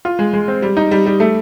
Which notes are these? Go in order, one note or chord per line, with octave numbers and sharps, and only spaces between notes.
F4
G#3
G#3
C4
G3
D#4
G3
G3
A3